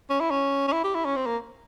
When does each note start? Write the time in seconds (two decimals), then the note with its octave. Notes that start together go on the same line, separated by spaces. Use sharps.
0.10 C#4
0.20 E4
0.31 C#4
0.67 C#4
0.72 E4
0.84 G4
0.94 E4
1.05 C#4
1.16 C4
1.26 A#3